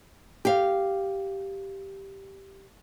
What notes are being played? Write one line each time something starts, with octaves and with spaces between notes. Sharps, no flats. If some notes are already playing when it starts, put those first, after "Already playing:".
G4 F5